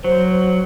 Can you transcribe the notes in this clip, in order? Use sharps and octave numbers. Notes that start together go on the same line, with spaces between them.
F#3 C5